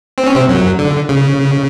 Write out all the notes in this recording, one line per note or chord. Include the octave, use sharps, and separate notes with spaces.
C4
C#4
C3 C4
F#2 F#3
D3
C#3